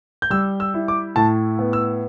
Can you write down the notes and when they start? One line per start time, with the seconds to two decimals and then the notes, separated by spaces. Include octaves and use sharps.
0.22 G6
0.30 G3 E6
0.60 E6
0.74 E4
0.88 D6
1.16 A2 A5
1.59 B3
1.73 E6